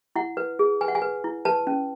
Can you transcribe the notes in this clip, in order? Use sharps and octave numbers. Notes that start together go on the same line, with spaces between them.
E4 F#5
B4
G#4
B4 G#5
F#5
G#5
B4
E4
B4 A5
C#4